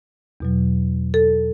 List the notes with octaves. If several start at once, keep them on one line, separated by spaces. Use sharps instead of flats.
E2 B2 F#3
A4